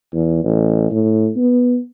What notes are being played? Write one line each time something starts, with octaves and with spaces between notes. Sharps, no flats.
E2
A1
A2
B3